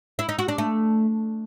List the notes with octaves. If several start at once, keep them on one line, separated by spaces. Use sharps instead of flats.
E4
D#4
F#4
D4
A3